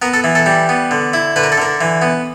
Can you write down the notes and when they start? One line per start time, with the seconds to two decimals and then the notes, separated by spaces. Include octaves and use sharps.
0.02 B3 A#4
0.13 A4
0.24 E3
0.35 A4
0.46 G3
0.69 B3
0.91 D3
1.13 E4
1.36 D3 B4
1.44 A#4
1.52 A4
1.57 D3 A#4
1.81 E3
2.02 B3